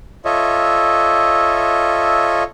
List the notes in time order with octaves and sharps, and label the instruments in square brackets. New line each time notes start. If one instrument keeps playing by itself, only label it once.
[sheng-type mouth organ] F4 A4 C#5 D#5 E5